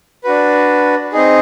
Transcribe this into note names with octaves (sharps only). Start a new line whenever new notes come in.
D4 F#4 B4
C4 D#4 G#4